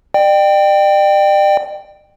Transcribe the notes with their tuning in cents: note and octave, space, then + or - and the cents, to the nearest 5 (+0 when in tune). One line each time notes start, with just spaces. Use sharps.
D5 +40 G5 +0